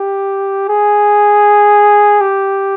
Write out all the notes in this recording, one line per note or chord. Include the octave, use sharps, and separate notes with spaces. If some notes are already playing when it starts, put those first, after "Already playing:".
Already playing: G4
G#4
G4